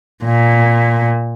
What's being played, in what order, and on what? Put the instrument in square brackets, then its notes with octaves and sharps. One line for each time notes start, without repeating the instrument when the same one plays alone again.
[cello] A#2